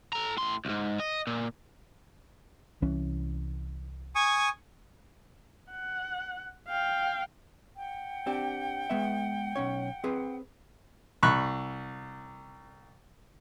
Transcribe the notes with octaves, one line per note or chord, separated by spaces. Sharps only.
A4 A#5
A2 C6
C2 G#2
D#5
A#2
C2 E3 C#4
G#5 C#6 D#6
F#5
F5 G5
F#5 G5
C4 D4 G4
G#3 B3 E5
B1 C#4 C#5
C4 G#4 B4
C2 B5 C#6 F#6